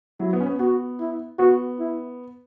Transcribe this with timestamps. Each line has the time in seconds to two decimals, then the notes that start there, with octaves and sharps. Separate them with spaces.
0.20 F#3 E4
0.33 B3
0.41 C#4
0.46 B3
0.59 B3 F#4
1.00 E4
1.38 B3 F#4
1.79 E4